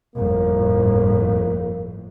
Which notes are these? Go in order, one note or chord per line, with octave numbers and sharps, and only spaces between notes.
G1 F2 A2 A#3